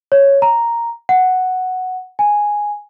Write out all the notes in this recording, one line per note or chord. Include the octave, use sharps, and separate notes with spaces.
C#5
A#5
F#5
G#5